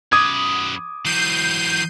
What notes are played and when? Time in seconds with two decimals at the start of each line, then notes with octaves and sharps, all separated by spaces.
0.12 F#2 B4 D6 D#6 G#6
1.05 E3 F#3 G6 C7 D#7